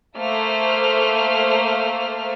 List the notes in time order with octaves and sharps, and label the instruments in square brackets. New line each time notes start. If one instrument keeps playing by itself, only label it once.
[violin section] A3 A#3 C5 F6